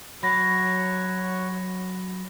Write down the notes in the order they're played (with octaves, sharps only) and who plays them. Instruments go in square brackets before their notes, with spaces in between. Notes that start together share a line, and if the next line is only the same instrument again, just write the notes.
[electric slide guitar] F#3 [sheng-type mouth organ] F#4 C#5 [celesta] B5 A#6